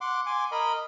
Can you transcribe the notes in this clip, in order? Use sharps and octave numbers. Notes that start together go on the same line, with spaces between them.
F#5 C6 D6
G#5 C6 D6
A#4 D#5 B5